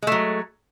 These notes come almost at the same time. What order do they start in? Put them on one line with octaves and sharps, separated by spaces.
G#3 A3 F#3